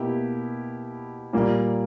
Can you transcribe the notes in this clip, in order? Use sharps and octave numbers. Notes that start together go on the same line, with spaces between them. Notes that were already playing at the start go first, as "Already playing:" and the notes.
Already playing: B2 A#3 E4 G4
A#2 G3 A#3